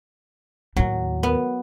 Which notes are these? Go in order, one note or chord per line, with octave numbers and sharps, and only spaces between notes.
D#2 A2 F#3
B3